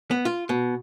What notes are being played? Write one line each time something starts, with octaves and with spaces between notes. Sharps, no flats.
B3
F4
B2